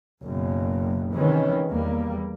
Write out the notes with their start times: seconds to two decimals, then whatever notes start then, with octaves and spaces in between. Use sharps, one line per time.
0.22 F#1 F#2 B2
1.12 C3 D#3 E3 G#3 C#4
1.69 E2 G3 A#3